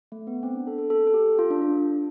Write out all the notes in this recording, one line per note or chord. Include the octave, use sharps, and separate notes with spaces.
A3
B3
C4
D4
A4
A4
A4
A4
G4
F4
D4
D4